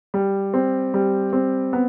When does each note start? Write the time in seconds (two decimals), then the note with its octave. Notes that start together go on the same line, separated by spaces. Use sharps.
0.14 G3
0.54 C4
0.94 G3
1.33 C4
1.73 B3